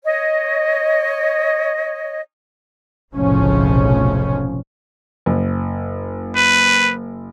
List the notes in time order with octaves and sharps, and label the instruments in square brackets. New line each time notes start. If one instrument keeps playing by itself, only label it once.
[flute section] C#5 D#5
[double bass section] F1 B1 A2 C#3 F3 C#4
[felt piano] F#1
[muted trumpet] B4